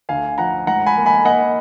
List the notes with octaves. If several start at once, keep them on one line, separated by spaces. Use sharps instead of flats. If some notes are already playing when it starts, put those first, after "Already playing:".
D2 F5 G#5
F3 F#5 A#5
G#2 F#5 A#5
G#5 B5
A#3
G#5 B5
A#3 D#5 F#5